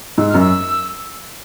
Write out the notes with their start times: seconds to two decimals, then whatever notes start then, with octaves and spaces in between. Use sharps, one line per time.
0.18 G#2 E6
0.29 F6
0.34 F#2
0.40 E6